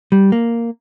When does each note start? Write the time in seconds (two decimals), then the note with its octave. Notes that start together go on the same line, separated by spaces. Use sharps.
0.12 G3
0.32 A#3